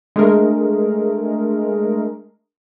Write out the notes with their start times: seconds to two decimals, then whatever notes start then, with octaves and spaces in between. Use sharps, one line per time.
0.16 G#3 A3 D4 G#4 A#4